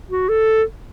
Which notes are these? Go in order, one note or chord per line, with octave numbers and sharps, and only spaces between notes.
F#4
A4